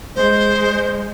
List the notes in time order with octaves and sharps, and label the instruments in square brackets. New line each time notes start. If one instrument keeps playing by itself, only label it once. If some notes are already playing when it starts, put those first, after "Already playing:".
[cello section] G#3 [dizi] C5